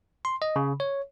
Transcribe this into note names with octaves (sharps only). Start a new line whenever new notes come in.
C6
D#5
C#3
C#5